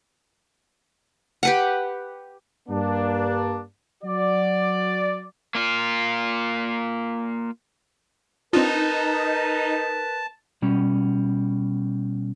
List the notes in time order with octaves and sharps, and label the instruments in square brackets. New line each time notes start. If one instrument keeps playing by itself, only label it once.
[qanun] G4 B4 F#5
[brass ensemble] G2 A#3 D4
F#3 F#4 D5
[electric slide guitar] A#3 F4
[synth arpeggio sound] C4 D4 F4 [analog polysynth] D#4 [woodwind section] A#4 B4 [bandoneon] A5
[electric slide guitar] B2 G3 C#4